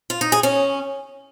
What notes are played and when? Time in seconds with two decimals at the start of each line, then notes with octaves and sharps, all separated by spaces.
0.10 F4
0.21 D#4
0.32 G#4
0.43 C#4